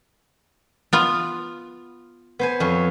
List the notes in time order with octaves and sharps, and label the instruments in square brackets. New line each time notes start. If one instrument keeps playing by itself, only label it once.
[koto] B3 F4
[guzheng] B3 C5 G#5
F2 C#5